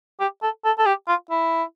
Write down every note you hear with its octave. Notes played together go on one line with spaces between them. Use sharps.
G4
A4
A4
A4
G4
F4
E4